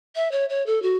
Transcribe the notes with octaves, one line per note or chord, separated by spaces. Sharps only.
E5
C#5
C#5
A4
F#4